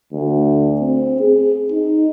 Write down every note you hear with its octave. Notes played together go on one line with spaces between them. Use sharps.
D2
C4
G#4
D#4